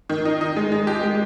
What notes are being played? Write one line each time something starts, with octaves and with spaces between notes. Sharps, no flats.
D#3
D#4
D#4
G#3
G#3
G4
G#3